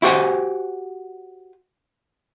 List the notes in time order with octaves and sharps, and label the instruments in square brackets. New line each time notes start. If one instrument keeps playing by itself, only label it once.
[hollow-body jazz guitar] E4 F#4 G4 C5 F#5 G#5